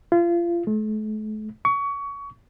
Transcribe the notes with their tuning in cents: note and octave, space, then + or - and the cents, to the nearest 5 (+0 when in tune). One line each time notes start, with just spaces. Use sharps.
F4 -30
A3 -40
C#6 +25